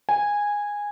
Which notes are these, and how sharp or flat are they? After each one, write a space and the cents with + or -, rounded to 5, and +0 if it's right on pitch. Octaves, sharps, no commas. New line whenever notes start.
G#5 -10